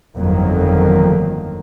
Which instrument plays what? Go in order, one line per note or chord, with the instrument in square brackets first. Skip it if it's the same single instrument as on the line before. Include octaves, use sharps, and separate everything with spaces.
[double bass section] G1 F2 D#3 F#3 A#3